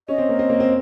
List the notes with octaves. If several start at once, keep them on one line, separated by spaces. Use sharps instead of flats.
C#4 D#5
C4
A#3
C4
A#3
C4